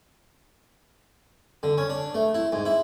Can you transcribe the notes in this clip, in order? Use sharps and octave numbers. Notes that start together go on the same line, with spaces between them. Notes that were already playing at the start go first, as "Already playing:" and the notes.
D3
C#4
D4
A3
E4
G#2
E4